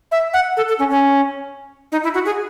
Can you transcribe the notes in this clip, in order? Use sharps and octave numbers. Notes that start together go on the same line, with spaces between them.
E5
F#5
A4
A4
C#4
C#4
D#4
E4
F#4
G#4